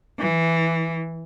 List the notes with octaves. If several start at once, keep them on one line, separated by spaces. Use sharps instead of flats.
E3